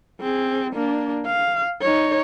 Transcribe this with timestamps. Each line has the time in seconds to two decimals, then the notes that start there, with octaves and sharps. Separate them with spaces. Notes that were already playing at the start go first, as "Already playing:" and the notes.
0.20 C4 G#4
0.74 A#3 D4
1.27 F5
1.82 D#4 C#5